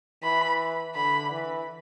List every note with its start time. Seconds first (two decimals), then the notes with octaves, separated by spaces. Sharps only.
0.23 E3 B5
0.95 D3 B5
1.31 E3